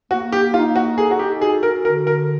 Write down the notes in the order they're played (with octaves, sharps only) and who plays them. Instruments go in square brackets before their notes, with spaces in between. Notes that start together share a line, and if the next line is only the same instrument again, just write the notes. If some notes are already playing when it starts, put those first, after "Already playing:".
[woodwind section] A#3 [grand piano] F#4
[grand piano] G4
[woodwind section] D#4 [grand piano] F4
[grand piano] F#4
[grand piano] G#4 [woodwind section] A4
[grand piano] F#4
G4
[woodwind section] F#4 [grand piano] G#4
[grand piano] A#4
[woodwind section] D3 [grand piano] A#4
[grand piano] A#4